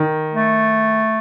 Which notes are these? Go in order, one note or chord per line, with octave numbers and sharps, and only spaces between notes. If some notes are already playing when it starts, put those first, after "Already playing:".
Already playing: D#3
A3